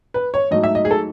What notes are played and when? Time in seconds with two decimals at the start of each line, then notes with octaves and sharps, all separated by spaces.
0.14 B4
0.34 C#5
0.51 G#2 F#3 A3 D#4 D#5
0.64 E5
0.75 D#5
0.85 G#4
0.91 A4